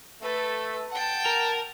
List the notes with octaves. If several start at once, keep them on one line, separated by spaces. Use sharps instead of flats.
A3 A4 B4
F#5 G5 A5
A#4